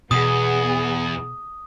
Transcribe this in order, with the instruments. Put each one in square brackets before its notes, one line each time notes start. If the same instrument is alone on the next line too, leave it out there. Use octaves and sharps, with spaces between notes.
[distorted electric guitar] E2 [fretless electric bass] B2 [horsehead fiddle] B3 G#4 [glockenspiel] D#6